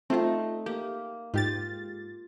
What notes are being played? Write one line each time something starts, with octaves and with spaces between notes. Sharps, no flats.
A3 C4 D#4 F4
A#3 G4
G#2 F4 G4 A6